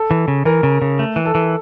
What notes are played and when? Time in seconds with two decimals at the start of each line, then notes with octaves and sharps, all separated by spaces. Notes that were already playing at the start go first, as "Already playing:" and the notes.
Already playing: A4
0.11 E3
0.28 C#3
0.45 E3 A#4
0.63 C#3
0.82 C#3
0.99 A3
1.16 E3
1.25 A4
1.35 E3